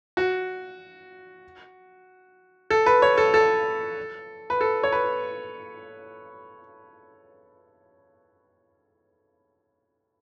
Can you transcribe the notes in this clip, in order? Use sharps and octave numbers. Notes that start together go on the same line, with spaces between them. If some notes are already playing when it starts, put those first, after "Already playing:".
F#4
A4
B4
C#5
A4
A4
B4
A4
C#5
B4